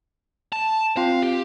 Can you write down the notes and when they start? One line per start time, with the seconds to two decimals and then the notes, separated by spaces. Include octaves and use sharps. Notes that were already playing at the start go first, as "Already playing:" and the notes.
0.52 A5
0.97 C4 F4 F5
1.22 G4